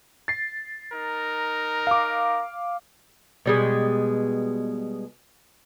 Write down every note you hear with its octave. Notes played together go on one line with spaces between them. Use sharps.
A6 C7
D#4 A#4
F5 D6
B2 G3 G#3